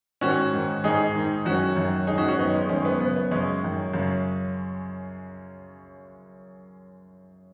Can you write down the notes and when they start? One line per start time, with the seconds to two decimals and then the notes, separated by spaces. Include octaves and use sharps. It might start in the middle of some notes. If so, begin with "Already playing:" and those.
0.21 G#2 D#3 C#4 F#4
0.53 G#2 D#3
0.84 G#2 D#3 D#4 G#4
1.15 G#2 D#3
1.45 F#2 D#3 C#4 F#4
1.77 F#2 D#3
2.07 G#2 D#3 D#4 G#4
2.18 C#4 F#4
2.28 C#4 F#4
2.39 F#2 D#3 B3 D#4
2.53 G#3 C#4
2.69 F#2 D#3 G#3 C#4
2.85 B3
3.00 F#2 C#3 B3
3.16 B3
3.31 F#2 C#3 G#3 C#4
3.62 F#2 D#3
3.93 F#2 C#3